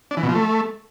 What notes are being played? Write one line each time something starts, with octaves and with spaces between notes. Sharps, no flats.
D4
E3
B2
F3
A3